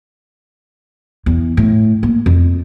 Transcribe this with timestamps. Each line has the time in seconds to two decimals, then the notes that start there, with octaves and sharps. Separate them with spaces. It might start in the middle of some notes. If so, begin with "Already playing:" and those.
1.26 E2
1.57 A2
2.03 A#3
2.26 F2